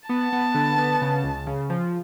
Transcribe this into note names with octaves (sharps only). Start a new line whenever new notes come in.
B3 A5
B3
D3
B3
C#3
C#2
C#3
F3